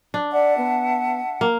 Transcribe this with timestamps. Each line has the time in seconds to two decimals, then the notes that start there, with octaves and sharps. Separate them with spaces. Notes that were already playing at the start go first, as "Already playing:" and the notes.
0.14 D4
0.32 D5 E5 F#5 A5
0.57 B3
1.41 A#3